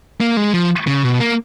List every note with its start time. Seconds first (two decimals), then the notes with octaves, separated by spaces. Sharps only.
0.20 A#3
0.37 G#3
0.54 F3
0.87 C#3
1.04 B2
1.20 A#3